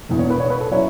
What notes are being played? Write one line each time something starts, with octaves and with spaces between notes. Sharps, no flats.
E1 E2 B2
C#5
B4
C#5
B4
A4
F#3 C#4 E4 C#5